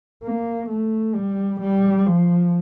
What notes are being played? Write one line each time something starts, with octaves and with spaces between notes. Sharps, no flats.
A#3
A3
G3
G3
F3